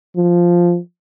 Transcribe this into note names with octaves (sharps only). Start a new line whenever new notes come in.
F3